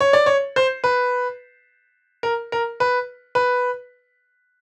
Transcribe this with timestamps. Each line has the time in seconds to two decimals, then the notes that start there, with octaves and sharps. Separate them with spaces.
0.01 C#5
0.13 D5
0.26 C#5
0.56 C5
0.84 B4
2.23 A#4
2.52 A#4
2.80 B4
3.35 B4